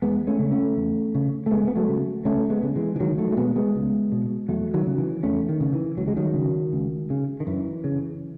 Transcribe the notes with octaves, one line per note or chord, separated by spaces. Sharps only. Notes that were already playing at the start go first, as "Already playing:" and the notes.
E2 G#3 B3
A3 C#4
C#3
A3 C#4
E2
C#3
A3
C#2 G#3 B3
B3
F#3 A3
C#3
C#2 A3 C#4
G#3 B3
C#3
E3 G#3
E3
C#2 D#3 F#3
F#3 A3
A3
B2 G#3 B3
G#3 B3
C#2
B2
E2 F#3 A3
D#3 F#3
C#3
E3
E2 A3 C#4
D#3
C#3
E3
C#2 F#3
G#3
D#3 F#3
C#3
C#2
C#3
D#3
F#2 E3
C#3